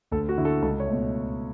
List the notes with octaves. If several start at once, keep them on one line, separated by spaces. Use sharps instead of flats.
D2 A4
F#4
D3 A3 E4
A4
C#2 A4
C#5
B2 A3